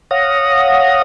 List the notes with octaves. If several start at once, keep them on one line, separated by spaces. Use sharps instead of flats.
C#5 F5 F#5 D#6 A#6